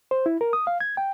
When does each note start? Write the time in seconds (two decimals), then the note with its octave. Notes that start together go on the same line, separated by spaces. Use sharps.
0.11 C5
0.26 E4
0.41 A#4
0.53 D#6
0.67 F5
0.81 G#6
0.97 G5